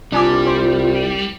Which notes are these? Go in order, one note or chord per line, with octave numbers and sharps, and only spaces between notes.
C2 G3 D4 F4 G#5 D6
C5